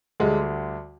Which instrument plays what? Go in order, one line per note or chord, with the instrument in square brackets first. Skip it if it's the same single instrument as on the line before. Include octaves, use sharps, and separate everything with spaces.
[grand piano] D2 D3 G3 [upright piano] G#3